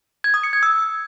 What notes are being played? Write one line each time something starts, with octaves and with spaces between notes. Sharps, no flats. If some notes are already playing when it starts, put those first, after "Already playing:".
G#6
D#6
C#7
G#6
E6